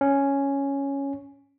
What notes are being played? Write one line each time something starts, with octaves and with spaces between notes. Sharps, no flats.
C#4